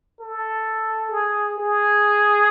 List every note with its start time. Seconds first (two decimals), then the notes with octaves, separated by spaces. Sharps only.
0.20 A4
1.12 G#4
1.58 G#4